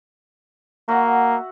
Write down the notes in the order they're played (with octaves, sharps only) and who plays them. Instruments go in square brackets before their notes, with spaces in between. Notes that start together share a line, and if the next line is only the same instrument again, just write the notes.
[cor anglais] A#3 [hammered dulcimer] F#4 E5 F#5